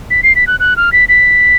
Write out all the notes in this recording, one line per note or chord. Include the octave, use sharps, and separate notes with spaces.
B6
C7
B6
F#6
F#6
F6
B6
B6